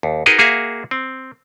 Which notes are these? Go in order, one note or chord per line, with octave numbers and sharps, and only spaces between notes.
D#2
D#4 F#4 G#4 A#4 B4 D#5
A#3 F#4 G#4 E5 F5
C4